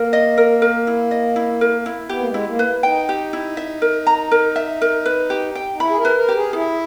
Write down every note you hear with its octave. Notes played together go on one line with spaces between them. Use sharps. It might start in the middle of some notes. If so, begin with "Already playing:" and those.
Already playing: A#3 A#4
D#5
A#4
A#4
E4
D#5
E4
A#4
E4
B3 G4
A#3
G#3
E4
A#3
B4
D#4 G5
G4
E4
E5
A#4
A#5
A#4
E5
A#4
B4
G4
G5
D#4
E4 B5
G#4
A#4
B4
A#4
G4
G#4
E4 G#4